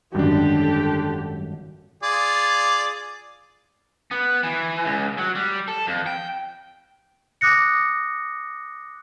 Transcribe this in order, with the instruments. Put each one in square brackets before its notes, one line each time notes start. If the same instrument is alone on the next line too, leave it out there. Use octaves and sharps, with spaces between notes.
[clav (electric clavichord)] G#1 F#2 [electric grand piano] D3 D4 [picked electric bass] G3 [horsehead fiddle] G4 A4
[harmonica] F4 G#4 D5
[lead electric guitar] B3
E3
C#2
F#3
G3
A4
F2
G5
[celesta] D6 D#6 F#6 A#6 C#7